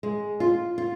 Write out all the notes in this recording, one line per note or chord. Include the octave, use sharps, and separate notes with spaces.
G#3
F4
F4